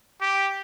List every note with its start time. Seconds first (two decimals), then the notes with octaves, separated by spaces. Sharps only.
0.21 G4